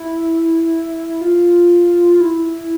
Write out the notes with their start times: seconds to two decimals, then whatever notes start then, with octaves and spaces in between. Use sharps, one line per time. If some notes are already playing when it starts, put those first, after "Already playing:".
Already playing: E4
1.21 F4
2.21 E4